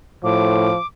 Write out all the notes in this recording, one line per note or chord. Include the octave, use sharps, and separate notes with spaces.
A2 F3 D6